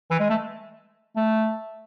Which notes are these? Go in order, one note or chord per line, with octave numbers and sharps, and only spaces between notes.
E3
G#3
A3
A3